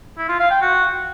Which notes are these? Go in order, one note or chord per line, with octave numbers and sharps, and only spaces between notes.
E4
F4
F5
G5
F#4